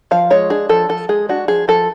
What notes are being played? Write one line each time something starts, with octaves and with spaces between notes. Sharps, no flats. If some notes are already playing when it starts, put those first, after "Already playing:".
F3 F5
G#3 C#5
D4 G#4
F3 A4
F3 A4
G#3 G#4
D4 F#4
F3 G#4
F3 A4